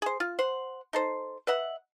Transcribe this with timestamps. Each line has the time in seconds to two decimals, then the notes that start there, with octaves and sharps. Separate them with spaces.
0.02 G#4 C5
0.20 F4
0.39 C5 F#5
0.93 D#4 A4 C5
1.47 B4 D#5 E5 F#5